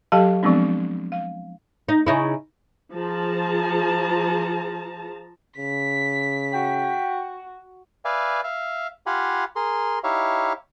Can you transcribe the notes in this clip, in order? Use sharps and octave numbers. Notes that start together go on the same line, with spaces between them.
F#3 G4 A4 F5 A5
F3 G#3 B3 C4 D4
F5
D#4
C#3 D#4 E4
F3 G#4 A5 A#5
C#3 B6
F#4 G5
B4 D5 E5 F5 G#5
E5 F5
F4 G4 F5 F#5 G#5 B5
G#4 A#4 C6
D#4 E4 G4 C#5 E5 F5